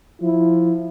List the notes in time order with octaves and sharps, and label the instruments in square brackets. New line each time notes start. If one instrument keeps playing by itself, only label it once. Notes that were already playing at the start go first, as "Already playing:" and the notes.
[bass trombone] F3 [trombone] E4